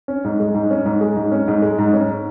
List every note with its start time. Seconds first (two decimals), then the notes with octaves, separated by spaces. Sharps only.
0.08 C#4
0.24 G#2
0.40 G#3
0.54 G#2
0.70 C#4
0.85 G#2
1.01 G#3
1.17 G#2
1.32 C#4
1.48 G#2
1.62 G#3
1.78 G#2
1.93 C#4